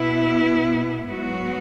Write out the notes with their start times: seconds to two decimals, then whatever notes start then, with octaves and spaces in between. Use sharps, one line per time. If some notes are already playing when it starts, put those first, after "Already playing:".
Already playing: B2 B3 E4
1.08 G#2 F#3 B3 F#4